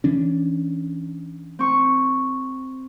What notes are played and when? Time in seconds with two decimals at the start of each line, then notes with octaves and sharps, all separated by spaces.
0.04 E3 C#4 D4
1.59 C4 C#6